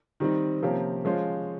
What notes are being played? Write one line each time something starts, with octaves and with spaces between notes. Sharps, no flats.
D#3 G3 C4 D#4
C3 F3 A#3 C#4 G4
F3 G#3 C#4 F4 C5